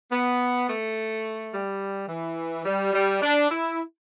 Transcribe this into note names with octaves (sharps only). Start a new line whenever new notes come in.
B3
A3
G3
E3
G3
G3
D4
E4